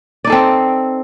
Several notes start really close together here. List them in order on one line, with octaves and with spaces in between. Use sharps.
D5 D#4 A4 C4